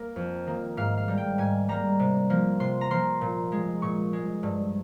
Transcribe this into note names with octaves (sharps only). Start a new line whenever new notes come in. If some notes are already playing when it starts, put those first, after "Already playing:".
Already playing: A#3 A#4
F2
D#3 A#3
G#2 F5
F5
G3 A#3
G5
G#2 G#5
G3 A#3 A#5
C3
F3 A#3
C3 C6
A#5
F3 A#3 C6
A#2
G#3
A#2 C#6
G#3
G2